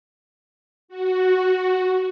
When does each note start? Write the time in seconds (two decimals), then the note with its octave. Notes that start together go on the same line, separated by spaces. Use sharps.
0.88 F#4